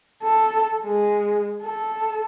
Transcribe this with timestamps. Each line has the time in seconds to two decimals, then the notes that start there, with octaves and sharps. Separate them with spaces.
0.22 A4
0.83 G#3
1.62 A4